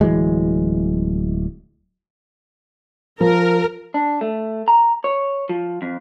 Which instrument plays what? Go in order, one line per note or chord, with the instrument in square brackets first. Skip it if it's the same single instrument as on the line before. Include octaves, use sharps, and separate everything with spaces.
[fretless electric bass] D1 E3 F#3 G#3
[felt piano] F3 [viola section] A#4
[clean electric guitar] D4
A3
A#5
C#5
F3
F2